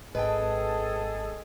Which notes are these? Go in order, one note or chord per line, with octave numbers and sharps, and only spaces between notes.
G#1 G#4 A4 B4 D#5 G5 A5